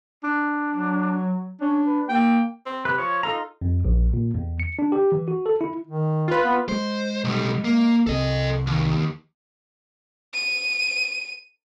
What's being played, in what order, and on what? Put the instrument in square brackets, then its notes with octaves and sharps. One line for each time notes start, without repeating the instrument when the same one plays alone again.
[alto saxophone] D4
[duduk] F#3
[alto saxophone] C#4 [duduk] D4
[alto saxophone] B4
[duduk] A#3 [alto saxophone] G5
[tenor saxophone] C4
[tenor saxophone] C3 [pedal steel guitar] B4
[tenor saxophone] F3 [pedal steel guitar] C#5
[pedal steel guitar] D#4 A4 A#5 [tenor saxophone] F4
[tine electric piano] F2
A#1
A#2
E2
C#7
D4
G4
E3
F#4
A4
E4
[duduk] D#3
[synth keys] F4 B4
[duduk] B3
[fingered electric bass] G#3 [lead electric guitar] C5
[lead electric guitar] B1 G3
A#3
[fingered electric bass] C2 C3 [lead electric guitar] A4 D#5
[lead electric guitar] D#2
[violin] D#7